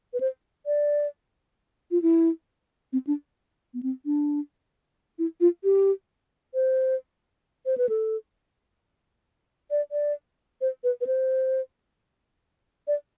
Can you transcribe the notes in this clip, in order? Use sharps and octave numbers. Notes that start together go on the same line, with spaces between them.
B4
C5
D5
F4
E4
C4
D4
B3
C4
D4
E4
F4
G4
C5
C5
B4
A4
D5
D5
C5
B4
B4
C5
D5